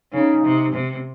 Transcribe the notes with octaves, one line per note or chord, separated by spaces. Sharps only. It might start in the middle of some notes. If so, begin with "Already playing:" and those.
C#3 D#4
C3
C3